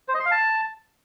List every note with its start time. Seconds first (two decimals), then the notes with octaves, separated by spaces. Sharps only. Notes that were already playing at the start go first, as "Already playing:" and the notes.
0.08 C5
0.14 D#5
0.20 C6
0.26 F5
0.31 A5